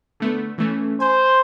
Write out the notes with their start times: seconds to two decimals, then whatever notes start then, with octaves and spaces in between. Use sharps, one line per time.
0.20 D3 A3 B3
0.58 E3 A3 C#4
1.00 C5 G#5